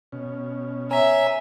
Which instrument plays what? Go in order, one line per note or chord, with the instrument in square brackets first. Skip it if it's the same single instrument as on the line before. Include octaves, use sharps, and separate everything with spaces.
[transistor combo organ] B2 C#4
[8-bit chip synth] C#5 G#5 A#5 [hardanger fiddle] E5